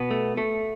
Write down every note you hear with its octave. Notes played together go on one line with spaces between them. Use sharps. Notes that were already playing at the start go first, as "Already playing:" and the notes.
Already playing: B2 B3
A3
A3